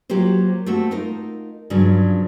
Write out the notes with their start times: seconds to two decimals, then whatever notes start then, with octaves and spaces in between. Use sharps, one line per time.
0.10 F#3 A#3 F4 G4 C5
0.66 A3 A#3 C4 F#4 A4
0.91 D#4 F4 A#4
1.70 G2 C#3 F3 F#3